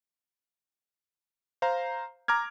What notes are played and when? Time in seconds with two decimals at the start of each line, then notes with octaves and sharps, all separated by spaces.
1.62 C5 F5 A#5
2.28 A#5 D6 F6 G#6